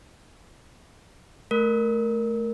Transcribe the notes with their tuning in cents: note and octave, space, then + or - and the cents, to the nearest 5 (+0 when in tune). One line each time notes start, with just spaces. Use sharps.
A3 -10 A#4 +0